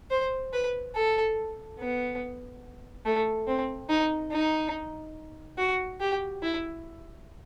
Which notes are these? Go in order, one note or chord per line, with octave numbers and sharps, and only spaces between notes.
C5
B4
A4
B3
A3
C4
D#4
D#4
F#4
G4
E4